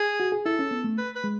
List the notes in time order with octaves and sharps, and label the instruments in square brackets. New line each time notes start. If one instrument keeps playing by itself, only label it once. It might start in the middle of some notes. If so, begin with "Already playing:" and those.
Already playing: [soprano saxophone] G#4
[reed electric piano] F#4
G#4
[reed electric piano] E4 [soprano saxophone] A4
[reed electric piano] C#4
B3
A3
[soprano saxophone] B4
B4
[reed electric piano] G#3